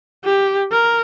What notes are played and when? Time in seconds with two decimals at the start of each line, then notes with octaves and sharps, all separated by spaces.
0.25 G4
0.72 A#4